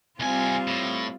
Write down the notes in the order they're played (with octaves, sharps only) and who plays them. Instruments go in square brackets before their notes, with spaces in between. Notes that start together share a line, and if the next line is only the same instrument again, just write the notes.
[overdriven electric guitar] C2 G#5 [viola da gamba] G3 C4 F4
[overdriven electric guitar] A2